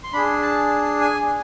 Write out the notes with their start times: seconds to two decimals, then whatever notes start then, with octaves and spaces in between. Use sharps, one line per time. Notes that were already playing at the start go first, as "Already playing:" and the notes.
0.04 C6
0.13 D4 G#4 B5
0.42 A5
1.01 G#5